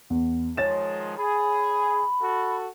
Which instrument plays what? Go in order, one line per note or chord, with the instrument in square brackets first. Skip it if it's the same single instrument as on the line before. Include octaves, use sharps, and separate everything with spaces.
[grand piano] E2
[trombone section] D#3 F3 G#3 [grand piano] C#5 A6 E7
[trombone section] G#4 [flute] B5
[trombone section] F#4 A4